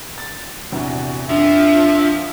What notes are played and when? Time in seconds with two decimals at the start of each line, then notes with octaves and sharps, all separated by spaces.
0.18 A6
0.72 A#1 E2 C3 F#4
1.29 F2 F3 D4 E5